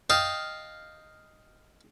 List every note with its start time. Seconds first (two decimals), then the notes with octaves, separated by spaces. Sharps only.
0.10 D#5 F5 G5 A5